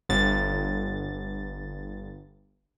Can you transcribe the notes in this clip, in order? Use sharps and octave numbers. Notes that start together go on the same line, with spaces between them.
G1 A6